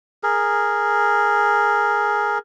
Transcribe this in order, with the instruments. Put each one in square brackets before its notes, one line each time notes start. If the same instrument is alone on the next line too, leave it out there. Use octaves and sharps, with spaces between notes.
[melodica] G#4 A#4